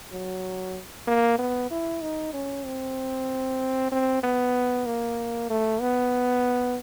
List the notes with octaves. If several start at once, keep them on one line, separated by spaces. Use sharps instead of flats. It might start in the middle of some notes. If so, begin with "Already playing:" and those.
F#3
A#3
B3
E4
D#4
C#4
C4
C4
B3
A#3
A3
B3